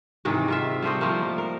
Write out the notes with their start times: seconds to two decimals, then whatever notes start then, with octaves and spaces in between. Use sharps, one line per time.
0.25 G#2 C3 D#3 E3
0.48 C3 F4 E5
0.82 G3 A3 C5 D#5
1.01 F3 G3 A3 A#3
1.38 A#4